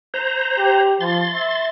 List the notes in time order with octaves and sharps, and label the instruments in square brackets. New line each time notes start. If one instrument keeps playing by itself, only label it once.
[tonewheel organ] C5 A#5
[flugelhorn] G4
[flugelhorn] F3 [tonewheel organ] C6 A6
[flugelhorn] E5